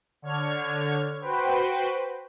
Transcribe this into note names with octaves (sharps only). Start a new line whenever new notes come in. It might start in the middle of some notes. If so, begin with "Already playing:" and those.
D3 C#5 F6 G#6
F#4 B4 C5 G5